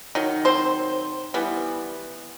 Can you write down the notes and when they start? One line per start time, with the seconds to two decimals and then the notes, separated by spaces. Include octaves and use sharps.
0.15 D#3 F#3
0.45 C4 C5
1.34 E3 G3 B3